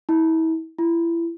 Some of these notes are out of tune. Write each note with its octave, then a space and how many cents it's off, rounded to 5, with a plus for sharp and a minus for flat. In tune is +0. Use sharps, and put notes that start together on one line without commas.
E4 -35
E4 +30